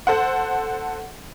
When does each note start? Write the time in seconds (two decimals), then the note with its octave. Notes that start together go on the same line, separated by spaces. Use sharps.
0.07 A4 C5 F#5